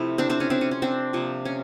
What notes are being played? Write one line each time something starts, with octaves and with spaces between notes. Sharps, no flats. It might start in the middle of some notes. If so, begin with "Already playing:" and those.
Already playing: C3 F3 A3 E4
C4 D4
C4 D4
C#4
C4 D4
C#4
C#4
C4 D4
C3 F3 A#3
C#4